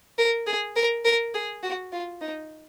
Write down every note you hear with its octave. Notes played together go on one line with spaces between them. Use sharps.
A#4
G#4
A#4
A#4
G#4
F#4
F4
D#4